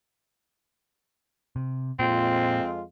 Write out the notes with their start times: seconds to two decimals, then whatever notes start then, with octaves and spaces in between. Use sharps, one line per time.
1.56 C3
1.99 F2 A#2 G#3 C4 F4